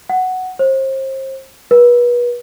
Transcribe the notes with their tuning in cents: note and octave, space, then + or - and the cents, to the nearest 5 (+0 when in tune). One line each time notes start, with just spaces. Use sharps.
F#5 +5
C5 +35
B4 -35